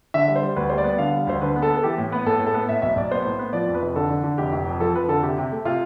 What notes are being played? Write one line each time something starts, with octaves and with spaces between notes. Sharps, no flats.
D3 E5
G3
C5
G3
D2 B4
G3 C5
D5
B3
D3 F5
G3
D2 C5
D3 B4
B3
A4
B3
A4
E3 G4
A2
B3 B4
A2 A4
A2
A4
B3
A2 E5
B1 E5
B1 D5
B3 C5
A2
B3
F3 D5
F2
B4
F1
D3 A4
D3
D3
F1 G4
F1
F2
F3 A4
F2 B4
D3 A4
C3 G4
C3
A3
C3 F4